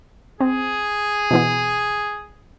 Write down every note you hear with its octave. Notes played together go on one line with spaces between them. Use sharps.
C4 G#4
B2 E3 B3